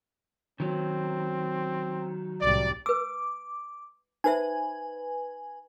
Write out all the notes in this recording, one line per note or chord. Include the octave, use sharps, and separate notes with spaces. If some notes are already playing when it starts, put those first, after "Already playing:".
D#3 F#3 C4
C2 A2 G3 D5
B4 D6 E6
D#4 B4 C5 E5 G#5